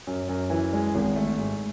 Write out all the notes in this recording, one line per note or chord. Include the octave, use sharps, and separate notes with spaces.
F#2
F#2
E3
G#3
G#1
A3
G#2